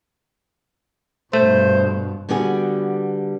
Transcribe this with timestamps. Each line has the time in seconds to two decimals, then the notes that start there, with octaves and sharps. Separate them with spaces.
1.33 G2 B2 A3 C5
2.29 D3 G3 B3 F#4 G#4